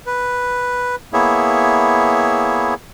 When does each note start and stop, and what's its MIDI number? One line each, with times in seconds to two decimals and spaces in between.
0.07 0.96 71
1.13 2.74 58
1.13 2.74 59
1.13 2.74 64
1.13 2.74 68
1.13 2.74 73
1.13 2.74 76